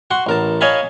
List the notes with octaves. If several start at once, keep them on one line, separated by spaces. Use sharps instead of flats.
F#4 F#5 C6
A1 A#4 A5
C#5 D#5 F5 G#5 A5 B5